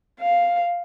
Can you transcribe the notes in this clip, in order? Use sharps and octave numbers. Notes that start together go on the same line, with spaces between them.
F5